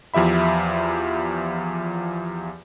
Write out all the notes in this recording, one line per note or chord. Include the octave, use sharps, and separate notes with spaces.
E2 F3 G4 E5 B5